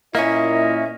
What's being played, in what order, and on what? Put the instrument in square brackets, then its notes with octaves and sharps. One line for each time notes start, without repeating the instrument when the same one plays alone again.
[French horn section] A#2 E4 [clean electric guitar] A#3 C#4 [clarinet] D#5 [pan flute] E5